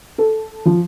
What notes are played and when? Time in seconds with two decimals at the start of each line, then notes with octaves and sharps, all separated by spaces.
0.18 A4
0.65 F3